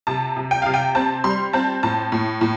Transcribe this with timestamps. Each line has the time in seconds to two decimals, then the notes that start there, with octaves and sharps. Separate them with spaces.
0.07 C3 A5
0.36 C3
0.51 G5
0.62 C3 F5
0.74 G5
0.95 C4 A5
1.24 G3 C6
1.53 C4 A5
1.83 A2 A5
2.12 A2
2.41 A2